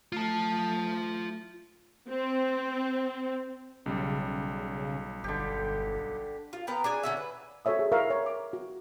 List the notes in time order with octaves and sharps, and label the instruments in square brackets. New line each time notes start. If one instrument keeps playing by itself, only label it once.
[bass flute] A3 [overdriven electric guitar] F4 A5
[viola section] C4
[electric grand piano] B1 G3 [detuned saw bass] C#3
[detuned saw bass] G1 [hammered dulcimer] D3 G4
[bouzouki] F4
B3 A#4 G5
D4 G#4 G#5
D3 C#4 E5
B4
[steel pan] F#4 A4 C5 C#5 E5 D#6
G#4
E4 A#4 E5 F5 C#6
C#5
D6
F#4